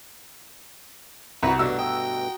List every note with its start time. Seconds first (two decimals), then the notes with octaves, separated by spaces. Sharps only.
1.43 C2 F#4 B4 A#5
1.59 G2 B2 A3 D4 E6
1.79 D#5 G5